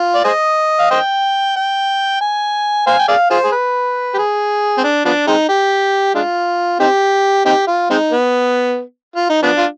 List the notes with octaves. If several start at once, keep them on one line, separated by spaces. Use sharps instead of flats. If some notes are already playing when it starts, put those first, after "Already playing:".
Already playing: F4
D5
G#4 C5 D#5
F5
C5 D#5 G5
G5
G#5
C5 F5 G#5
G5
G#4 D5 F5
F4 G#4 C5
G#4
B4
G4
G#4
C4
D4
F3 B3 D4
G#3 C4 D#4
G4
G#3 D4 F4
C4 D#4 G4
C4 D#4 G4
F4
G#3 C4 D#4
B3
F4
D#4
F3 B3 D4
F4